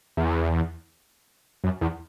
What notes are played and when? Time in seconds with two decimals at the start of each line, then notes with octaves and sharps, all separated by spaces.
0.17 E2
1.64 F#2
1.81 E2